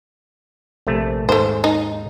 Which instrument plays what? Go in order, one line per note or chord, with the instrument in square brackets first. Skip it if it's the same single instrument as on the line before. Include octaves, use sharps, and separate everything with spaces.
[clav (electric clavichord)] A#1 C3 A3
[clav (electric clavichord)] D#2 G#2 [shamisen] A3 C5
[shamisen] D#4